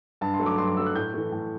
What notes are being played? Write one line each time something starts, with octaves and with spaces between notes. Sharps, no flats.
G2 A5
C6
F#3 A3
D6
G2 C6
D6
F#3 A3 E6
F#6
A2 G6
E3 A3
A2